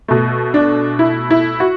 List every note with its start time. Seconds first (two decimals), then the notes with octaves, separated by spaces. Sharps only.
0.08 B2 A3
0.54 D4
0.99 E4
1.31 E4
1.60 F#4